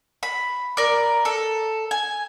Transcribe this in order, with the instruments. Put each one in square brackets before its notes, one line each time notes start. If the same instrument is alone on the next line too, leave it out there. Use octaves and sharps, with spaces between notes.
[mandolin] B5
A#4 D5
A4
G#5